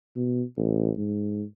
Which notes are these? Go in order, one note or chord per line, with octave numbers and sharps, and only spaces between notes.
B2
A1
G#2